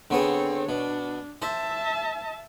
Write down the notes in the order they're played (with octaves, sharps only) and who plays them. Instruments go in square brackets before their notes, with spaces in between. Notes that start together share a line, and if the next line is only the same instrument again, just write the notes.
[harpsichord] D3 B3 G#4 [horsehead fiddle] C4 C#5
[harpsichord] B2 [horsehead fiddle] D4
[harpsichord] C5 [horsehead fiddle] E5 A5